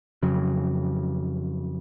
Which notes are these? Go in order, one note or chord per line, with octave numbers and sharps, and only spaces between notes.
F2 C#3 F#3